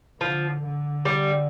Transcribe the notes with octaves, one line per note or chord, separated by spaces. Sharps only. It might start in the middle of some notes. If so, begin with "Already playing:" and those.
D3 F3
D3
G3